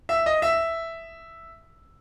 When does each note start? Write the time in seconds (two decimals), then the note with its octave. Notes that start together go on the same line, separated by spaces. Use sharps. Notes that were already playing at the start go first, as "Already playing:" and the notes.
0.09 E5
0.26 D#5
0.42 E5